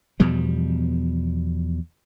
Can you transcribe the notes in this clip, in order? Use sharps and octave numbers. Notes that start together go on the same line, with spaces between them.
E2 B2 F3 G3